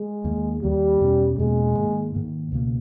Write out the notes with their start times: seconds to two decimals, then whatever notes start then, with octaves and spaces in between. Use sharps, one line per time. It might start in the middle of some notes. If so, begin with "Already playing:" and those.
Already playing: G#3
0.24 D#2 D#3 A#3
0.62 D#2 D#3 G3 A#3
1.01 E2 B2 A#3 C#4
1.38 E2 B2 G#3 A#3 C#4
1.76 G#2 D#3 A#3
2.15 G#2 D#3 A#3
2.52 C#2 B2 A#3